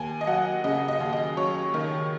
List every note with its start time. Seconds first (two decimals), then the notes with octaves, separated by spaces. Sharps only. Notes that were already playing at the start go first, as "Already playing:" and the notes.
Already playing: D#2 G#5
0.21 D#5
0.27 F#3 F#5
0.64 C#3 D#5
0.88 D#5
1.00 D#2
1.13 D#5
1.37 F#3 C#5
1.74 D#3